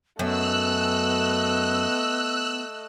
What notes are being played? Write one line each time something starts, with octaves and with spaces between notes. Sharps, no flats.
F#2 A3 B3 D#5 E6 F#6